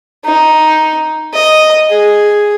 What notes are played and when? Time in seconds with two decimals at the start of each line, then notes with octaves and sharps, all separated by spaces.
0.25 D#4
1.34 D#5
1.90 G#4